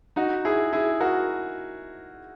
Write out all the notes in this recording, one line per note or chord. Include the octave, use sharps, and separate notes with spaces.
D#4 F#4
E4 G#4
E4 G#4
F#4 A#4